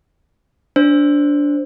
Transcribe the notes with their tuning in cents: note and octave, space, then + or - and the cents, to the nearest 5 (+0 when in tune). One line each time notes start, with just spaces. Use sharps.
D4 -15 C5 +0